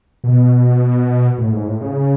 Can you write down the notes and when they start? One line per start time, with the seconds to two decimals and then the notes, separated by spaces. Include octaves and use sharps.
0.24 B2
1.38 A2
1.52 G#2
1.67 A2
1.81 C#3